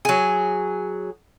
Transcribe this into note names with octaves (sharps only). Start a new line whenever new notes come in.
F#3 G#4